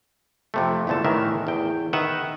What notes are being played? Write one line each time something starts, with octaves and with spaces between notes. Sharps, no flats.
F2 C3 A3
G1 E2 D3 A3 A5
A2 D#3 E3 A#4 E5
E2 G5
D#3 B4 E5 F#5